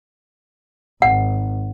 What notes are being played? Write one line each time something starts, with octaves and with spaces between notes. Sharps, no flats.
G#1 F#5